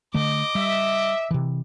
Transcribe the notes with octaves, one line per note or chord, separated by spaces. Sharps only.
D3 A3 D#5 D6
G3 E5
C3 E3